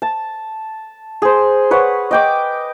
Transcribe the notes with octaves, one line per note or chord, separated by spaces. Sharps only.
A5
G#4 C5
B4 C#5 F#5
D#5 G5 D6